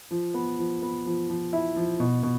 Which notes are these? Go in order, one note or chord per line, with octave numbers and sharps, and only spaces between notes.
F3
B3
F3
B3
F3
F3
E4
F3
B2
B2